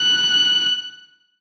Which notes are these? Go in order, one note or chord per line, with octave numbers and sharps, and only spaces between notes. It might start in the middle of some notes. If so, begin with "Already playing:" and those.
Already playing: F#6